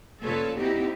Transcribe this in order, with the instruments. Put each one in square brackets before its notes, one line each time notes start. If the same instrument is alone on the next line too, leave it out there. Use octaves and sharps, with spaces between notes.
[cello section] A#2 C#3 F4 A4 B4 C#5
C4 D#4 E4 F#4 G4